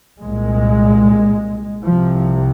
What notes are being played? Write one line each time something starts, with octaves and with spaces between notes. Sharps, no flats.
C2 A#2 G#3
C2 C3 F3